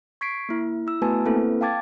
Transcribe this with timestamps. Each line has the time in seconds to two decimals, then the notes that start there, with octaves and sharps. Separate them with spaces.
0.21 C#6 G#6 B6 C7 D7
0.49 A#3 E4
0.87 E4 E6
1.02 A3 B3 F#4 B4 G#5 A5
1.25 A#3 C4 E4 A4 B4
1.61 F5 G5 A5 D6 G#6 A6